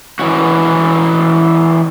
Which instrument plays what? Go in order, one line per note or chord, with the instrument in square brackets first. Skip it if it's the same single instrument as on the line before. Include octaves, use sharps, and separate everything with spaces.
[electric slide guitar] E3 C#4 F#4